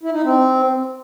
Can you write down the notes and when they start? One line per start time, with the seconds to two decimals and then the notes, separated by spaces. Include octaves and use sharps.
0.03 E4
0.14 D#4
0.24 C4